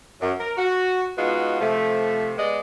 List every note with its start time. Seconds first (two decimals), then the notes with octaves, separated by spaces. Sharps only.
0.21 F#2
0.39 A#4
0.57 F#4
1.18 G#3 B3 D#4 F4 F#4
1.60 C3 F3 A3
2.37 G#3 B3 D5 D#5